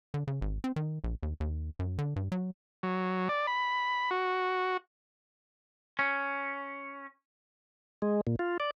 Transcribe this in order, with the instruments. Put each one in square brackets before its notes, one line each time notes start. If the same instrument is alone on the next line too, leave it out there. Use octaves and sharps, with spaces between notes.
[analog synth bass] D3
C#3
G#1
C4
D#3
A#1
D#2
D#2
F#2
D3
G2
F#3
[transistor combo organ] F#3
D5
B5
F#4
[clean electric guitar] C#4
[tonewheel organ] G#3
A#2
F4
D5